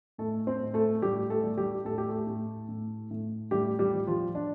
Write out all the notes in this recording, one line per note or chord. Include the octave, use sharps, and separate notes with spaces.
A2 A3 A4
C4 C5
A2
A3 A4
A2 G3 G4
A3 A4
G3
G3 G4
A2 A4
G4
A3 A4
A2
A2
A2
A2 G3 G4
G3 G4
F3
F3 F4
F3 D4